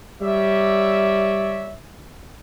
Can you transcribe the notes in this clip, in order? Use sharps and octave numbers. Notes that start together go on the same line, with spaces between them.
G3 C#5 D5 E5